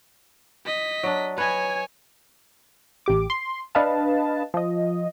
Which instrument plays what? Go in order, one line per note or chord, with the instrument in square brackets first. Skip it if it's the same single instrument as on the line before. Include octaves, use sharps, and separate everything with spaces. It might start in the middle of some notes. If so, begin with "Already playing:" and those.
[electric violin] D#5 B6
[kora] F#3 D4
[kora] B4 D#5 [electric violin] C#5 G#5
[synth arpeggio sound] A1 G4 D6
C6
D4 B4 D#5 F5 A5
F3 D#5